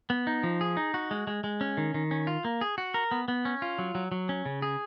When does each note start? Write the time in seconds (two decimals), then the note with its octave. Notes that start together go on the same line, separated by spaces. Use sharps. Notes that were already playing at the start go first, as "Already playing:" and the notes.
0.10 B3
0.27 D#4
0.43 F3
0.61 G#4
0.77 D#4
0.94 F#4
1.11 G#3
1.27 G#3
1.44 G#3
1.61 C#4
1.77 D#3
1.94 D#3
2.11 C#4
2.27 F4
2.45 A#3
2.61 G#4
2.78 F#4
2.94 A#4
3.11 B3
3.28 B3
3.45 C#4
3.62 F4
3.79 F#3
3.95 F#3
4.12 F#3
4.29 C#4
4.45 C#3
4.62 G#4